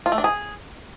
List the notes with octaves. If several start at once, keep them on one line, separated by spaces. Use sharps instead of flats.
F4
A3
D4
G#4